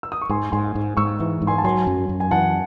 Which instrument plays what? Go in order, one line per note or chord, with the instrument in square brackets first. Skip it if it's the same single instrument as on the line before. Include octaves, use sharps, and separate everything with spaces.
[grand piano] E6
D#6
C#6
[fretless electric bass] G#2 [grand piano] G#5 C6
[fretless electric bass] G#2 [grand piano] G#5 C6
[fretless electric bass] G#2
[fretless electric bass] G#2 [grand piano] C#6 E6
[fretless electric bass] E3
G#2
[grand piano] G#5 C6
A5
[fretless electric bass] F#3 [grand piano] G#5 C6
[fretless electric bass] F#2
F#2
[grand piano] G#5
[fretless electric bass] E3 [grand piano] F#5 A5